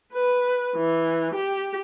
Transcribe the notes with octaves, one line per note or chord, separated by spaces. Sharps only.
B4
E3
G4